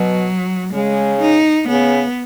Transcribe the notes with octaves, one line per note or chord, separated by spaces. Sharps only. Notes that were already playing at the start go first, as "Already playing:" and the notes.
Already playing: B2 F#3
C#3 G#3
D#4
C#3 B3